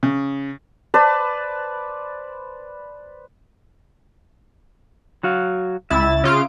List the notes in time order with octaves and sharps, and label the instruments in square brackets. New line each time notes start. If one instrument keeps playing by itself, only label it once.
[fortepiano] C#3
[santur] B4 C5 D5 A5
[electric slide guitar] F#3 F#4 F5
[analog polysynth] C#2 E4 A6 [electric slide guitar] E5
[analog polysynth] C#3 F4 D7